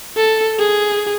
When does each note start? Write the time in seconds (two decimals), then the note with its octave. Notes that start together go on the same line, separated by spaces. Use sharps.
0.17 A4
0.59 G#4